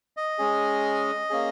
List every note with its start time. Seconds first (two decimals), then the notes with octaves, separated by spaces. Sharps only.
0.17 D#5
0.38 G#3 C#4 G#4
1.30 A#3 C#4 G#4